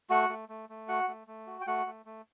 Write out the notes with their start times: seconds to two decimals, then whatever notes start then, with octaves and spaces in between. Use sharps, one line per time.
0.10 A3 F#4 F#5
0.29 A3
0.49 A3
0.69 A3
0.89 F#4 F#5
1.08 A3
1.27 A3
1.47 F#4
1.61 G5
1.67 A3 F#4 F#5
1.86 A3
2.06 A3